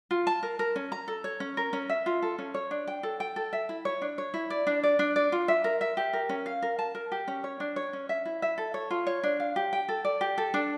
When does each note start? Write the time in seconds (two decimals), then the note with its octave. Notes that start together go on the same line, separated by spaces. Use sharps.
0.11 F4
0.27 A5
0.43 A#4
0.59 A#4
0.76 C#4
0.92 A#5
1.08 A4
1.24 C#5
1.40 C#4
1.57 A#4
1.73 C#4
1.89 E5
2.06 F4
2.22 A4
2.38 C#4
2.54 C#5
2.71 D4
2.87 G5
3.03 A4
3.20 G5
3.36 A4
3.53 E5
3.69 E4
3.85 C#5
4.02 D4
4.18 C#5
4.34 E4
4.50 D5
4.67 D4
4.83 D5
4.99 D4
5.16 D5
5.32 F4
5.48 E5
5.64 A#4
5.81 E5
5.97 G4
6.13 A#4
6.29 C#4
6.46 F5
6.62 A#4
6.79 A5
6.95 A#4
7.12 G4
7.28 C#4
7.44 C#5
7.60 D4
7.76 C#5
7.93 C#4
8.09 E5
8.25 E4
8.42 E5
8.58 A4
8.74 C#5
8.91 F4
9.07 C#5
9.23 D4
9.40 F5
9.56 G4
9.73 G5
9.89 A4
10.05 D5
10.21 G4
10.38 A4
10.54 D4